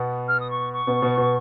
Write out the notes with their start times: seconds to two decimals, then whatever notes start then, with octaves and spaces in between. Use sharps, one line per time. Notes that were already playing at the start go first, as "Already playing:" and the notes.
Already playing: B2 B3
0.28 F6
0.39 D#6
0.50 C#6
0.72 C#6
0.87 B2 B3
1.02 B2 B3
1.17 B2 B3